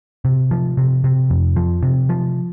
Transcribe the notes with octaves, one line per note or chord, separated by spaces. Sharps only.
C3
F3
C3
C3
F2
F3
C3
F3